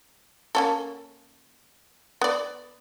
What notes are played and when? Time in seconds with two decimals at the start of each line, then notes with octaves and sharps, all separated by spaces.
0.55 A#3 C#4 A4
2.21 B3 D5